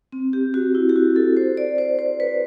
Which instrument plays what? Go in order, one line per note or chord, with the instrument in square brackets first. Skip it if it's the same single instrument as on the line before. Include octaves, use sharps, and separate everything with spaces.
[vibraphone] C4
G4
F#4
E4
G4
F#4
A4
C5
D5
C5
C5
B4